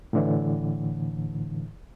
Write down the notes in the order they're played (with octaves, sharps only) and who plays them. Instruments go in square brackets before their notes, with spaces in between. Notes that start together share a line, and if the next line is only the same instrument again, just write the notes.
[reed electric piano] A2 D3 E3